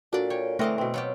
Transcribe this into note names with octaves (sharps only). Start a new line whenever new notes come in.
A#2 D4 F#4 A4 D5
C#5 G5
D3 E3 A3 C4 F#4 A#4 D#5 F5
B2 C4
F#3 F4 G4 F#5